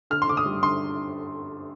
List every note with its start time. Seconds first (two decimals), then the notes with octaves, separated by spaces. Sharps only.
0.10 D3 F6
0.22 C6
0.28 D3 D6
0.37 D#6
0.46 G3
0.62 D3 C6